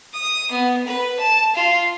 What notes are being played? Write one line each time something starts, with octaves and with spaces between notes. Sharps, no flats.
D#6
B3
B4
A5
F4